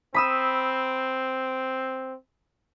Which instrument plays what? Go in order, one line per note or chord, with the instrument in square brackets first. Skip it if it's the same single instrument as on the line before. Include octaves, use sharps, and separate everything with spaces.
[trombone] C4 [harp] B5 D#6 E6